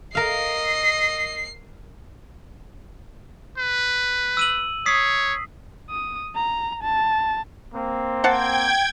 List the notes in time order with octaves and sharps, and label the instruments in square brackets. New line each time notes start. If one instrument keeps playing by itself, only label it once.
[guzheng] A#4 F5 [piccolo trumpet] D#5 [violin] C7
[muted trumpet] B4
[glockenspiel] E6 D#7 F#7
[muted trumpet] C#5 [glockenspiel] D#6 B6 C7
[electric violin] D#6
A#5
A5
[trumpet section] A#3 C4
[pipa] C5 F#5 A5 [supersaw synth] G5 G#6